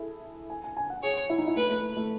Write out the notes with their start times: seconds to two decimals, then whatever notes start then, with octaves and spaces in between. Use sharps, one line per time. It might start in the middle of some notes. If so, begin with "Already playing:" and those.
Already playing: E4 G#4 A4
0.50 G#5
0.64 G#5
0.77 G#5
0.90 F#5
1.03 G#4 C#5
1.30 E4
1.38 D#4
1.48 E4
1.56 A3 B4
1.69 A3
1.97 A3